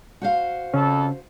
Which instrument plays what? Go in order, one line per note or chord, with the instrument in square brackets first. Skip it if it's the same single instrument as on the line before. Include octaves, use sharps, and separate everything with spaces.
[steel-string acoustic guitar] F#4 C5 F5
[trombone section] F2 A4 [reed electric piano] C#3 C#4